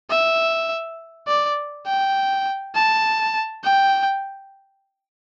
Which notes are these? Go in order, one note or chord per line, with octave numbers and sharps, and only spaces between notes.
E5
D5
G5
A5
G5